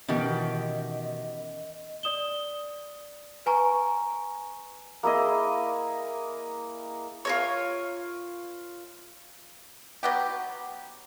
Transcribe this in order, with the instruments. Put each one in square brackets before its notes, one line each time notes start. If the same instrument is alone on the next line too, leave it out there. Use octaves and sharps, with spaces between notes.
[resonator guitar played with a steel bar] B2 D#3 G4 [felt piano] E3 [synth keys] B3 C#4 [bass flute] D#5
[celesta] D5 D#6 E7 G7
B4 G#5 A#5 C#6
[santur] A#3 E4 G#4 D#5
[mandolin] F4 A#4 C#5
[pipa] F#3 B3 G4